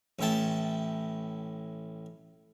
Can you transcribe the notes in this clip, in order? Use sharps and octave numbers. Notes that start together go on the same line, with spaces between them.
A1 A2 E4 G5 A5